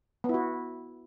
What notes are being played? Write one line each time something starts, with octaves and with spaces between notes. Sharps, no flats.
B3 E4 F#4